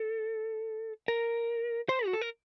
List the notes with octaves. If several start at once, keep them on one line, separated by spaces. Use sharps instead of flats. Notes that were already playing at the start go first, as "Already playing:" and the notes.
Already playing: A4
A#4
C5
F#4
A4
A#4